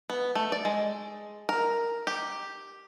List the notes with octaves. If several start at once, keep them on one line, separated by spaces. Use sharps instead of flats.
B3
A3
D5
G#3
A#4
G4